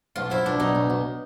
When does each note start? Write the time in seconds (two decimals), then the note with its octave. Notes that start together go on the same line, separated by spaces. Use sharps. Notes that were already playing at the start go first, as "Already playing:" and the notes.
0.16 B1 F4
0.30 F3 E4
0.46 B1 D4
0.60 B1 D#4
0.75 B1
0.90 B1